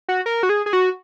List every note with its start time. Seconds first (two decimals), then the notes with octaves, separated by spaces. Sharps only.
0.09 F#4
0.26 A#4
0.43 F#4
0.49 G#4
0.66 G#4
0.73 F#4